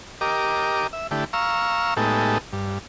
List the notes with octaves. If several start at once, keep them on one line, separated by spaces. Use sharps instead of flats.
G4 A#4 D#5 D6
E5
D3 A3 E4 G4
F5 A#5 C#6 E6
A2 G#3 B3 D#4 G4 A4
G2